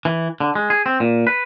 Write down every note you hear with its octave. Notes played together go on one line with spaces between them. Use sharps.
E3
D3
G#3
G#4
C4
A#2
B4